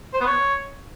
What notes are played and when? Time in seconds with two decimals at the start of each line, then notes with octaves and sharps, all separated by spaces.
0.14 C5
0.20 B3
0.27 C#5